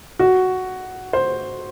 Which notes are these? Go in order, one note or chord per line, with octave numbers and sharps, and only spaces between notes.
F#4
C5